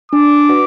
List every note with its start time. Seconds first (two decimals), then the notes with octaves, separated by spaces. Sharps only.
0.12 D4 D6
0.49 F#4 B4 D5 F#5